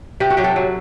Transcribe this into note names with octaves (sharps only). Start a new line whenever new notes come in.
C3 G4
F#4
F#3 G4
A4
F#3